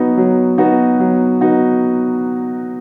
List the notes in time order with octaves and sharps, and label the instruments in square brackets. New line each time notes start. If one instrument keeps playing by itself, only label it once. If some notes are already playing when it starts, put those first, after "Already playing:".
Already playing: [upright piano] F#3 B3 D#4 F#4
F#3
B3 D#4 F#4
F#3
B3 D#4 F#4